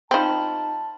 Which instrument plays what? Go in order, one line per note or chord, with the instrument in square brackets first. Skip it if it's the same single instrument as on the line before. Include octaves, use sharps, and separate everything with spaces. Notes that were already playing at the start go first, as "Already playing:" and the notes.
[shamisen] F3 C4 [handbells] D#4 B5 [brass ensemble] A5